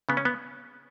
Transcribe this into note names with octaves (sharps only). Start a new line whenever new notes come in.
C#3 B3
C#4
B3